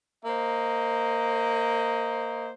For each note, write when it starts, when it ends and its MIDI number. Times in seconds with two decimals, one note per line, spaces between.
0.25 2.51 58
0.25 2.51 72
0.25 2.51 75